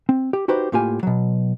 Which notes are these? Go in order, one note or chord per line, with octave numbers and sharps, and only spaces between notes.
C4
G4
D#4 F#4 G4 B4 C5
A2 A#3 F4 G4 G#5
B2 F#3